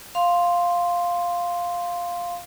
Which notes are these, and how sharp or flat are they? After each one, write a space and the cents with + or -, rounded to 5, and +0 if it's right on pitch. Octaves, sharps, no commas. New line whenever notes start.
F5 +0 C6 +0